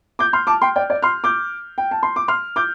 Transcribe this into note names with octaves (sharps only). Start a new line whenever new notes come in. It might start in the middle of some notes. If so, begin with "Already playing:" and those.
D6 G6
C6 F6
A5 D6
G5 C6
D5 G5
D5
C6 F6
D6 G6
G5
A5
C6
D6
C6 F6
D6 G6